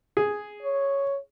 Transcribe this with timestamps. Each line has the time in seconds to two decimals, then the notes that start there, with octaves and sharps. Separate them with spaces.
0.17 G#4
0.62 C#5